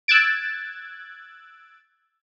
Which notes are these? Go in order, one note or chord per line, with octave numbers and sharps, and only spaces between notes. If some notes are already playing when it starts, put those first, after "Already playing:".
E6 F#6 G#6 A6 D7